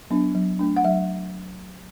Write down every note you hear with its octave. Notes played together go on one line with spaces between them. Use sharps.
F#3 B3 D4
F#3
A3 D4
F#5
F#3 E5